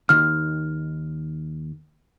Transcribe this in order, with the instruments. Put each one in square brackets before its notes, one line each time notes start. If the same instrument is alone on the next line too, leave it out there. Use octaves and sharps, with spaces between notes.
[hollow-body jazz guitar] D#2 D#3 [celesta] F6